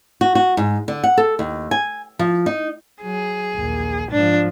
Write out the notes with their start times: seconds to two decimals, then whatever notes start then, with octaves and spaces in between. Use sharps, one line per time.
0.21 F#4
0.35 F#4
0.57 G#2
0.88 D3
1.04 F#5
1.17 A4
1.39 D#2
1.71 G#5
2.19 F3
2.46 D#4
3.03 F#3 G#4
3.56 A#1 D#2
4.11 G#2 F3 D4